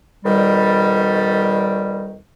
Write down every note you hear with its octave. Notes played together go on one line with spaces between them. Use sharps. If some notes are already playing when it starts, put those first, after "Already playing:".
F2 B2 D#3 G3